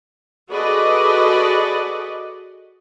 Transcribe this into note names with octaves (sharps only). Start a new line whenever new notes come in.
F#4 G#4 A4 B4 D5 D#5